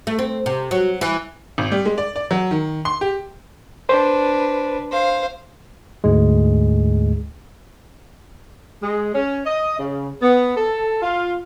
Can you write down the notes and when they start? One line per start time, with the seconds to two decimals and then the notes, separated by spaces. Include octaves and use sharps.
0.07 A3
0.19 C4
0.46 C3
0.71 F#3
1.01 E3
1.58 G#1
1.72 G3
1.86 G#3
1.98 D5
2.16 D5
2.31 F#3
2.51 D#3
2.85 C6
3.01 G4
3.89 D4 B4 C5
4.91 C5 F5
6.04 D2 G#2 G#3
8.83 G#3
9.15 C#4
9.46 D#5
9.79 C#3
10.22 B3
10.57 A4
11.02 F4